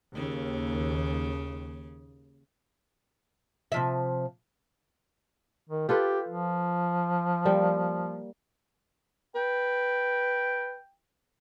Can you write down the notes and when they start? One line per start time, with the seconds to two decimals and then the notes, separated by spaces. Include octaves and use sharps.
0.15 D#2 C#3
3.72 C3 F3 E5
5.70 D#3
5.89 F4 G4 A4 B4
6.28 F3
7.45 G3 A#3
9.35 B4 G5